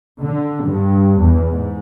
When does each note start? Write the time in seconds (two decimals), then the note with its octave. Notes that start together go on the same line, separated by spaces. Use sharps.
0.21 D3
0.65 G2
1.20 E2
1.51 G#2